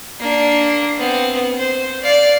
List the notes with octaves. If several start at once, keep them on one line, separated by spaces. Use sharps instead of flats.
A#3 D4
B3 C4
C5
D5 F5